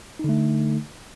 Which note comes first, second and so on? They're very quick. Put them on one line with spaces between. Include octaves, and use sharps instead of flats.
D#4 D3 A3